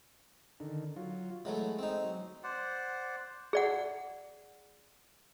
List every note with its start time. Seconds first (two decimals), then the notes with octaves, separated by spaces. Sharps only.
0.60 D3 D#3
0.96 F#3 F4
1.45 E3 F#3 G#3 A3
1.79 C4 D#4
2.04 F#3
2.43 C5 D5 F#5
3.53 G#4 D5 F#5